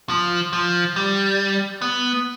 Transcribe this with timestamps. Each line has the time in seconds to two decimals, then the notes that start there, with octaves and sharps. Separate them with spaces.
0.09 F3
0.53 F3
0.96 G3
1.82 B3